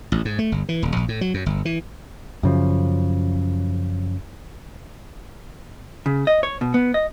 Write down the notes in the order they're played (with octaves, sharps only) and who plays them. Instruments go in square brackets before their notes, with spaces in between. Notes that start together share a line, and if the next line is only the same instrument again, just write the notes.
[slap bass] A1
G#2
A3
G1
E3
D#1
A#1
A2
F#3
F#2
G1
E3
[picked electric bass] F#2 C#3 F3
[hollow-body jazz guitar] C#3
D#5
C#5
B2
B3
D#5